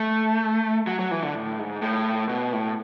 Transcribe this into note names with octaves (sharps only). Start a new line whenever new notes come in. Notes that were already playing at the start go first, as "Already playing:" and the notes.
Already playing: A3
F#3
F#3
E3
D3
A2
G#2
A2
B2
A2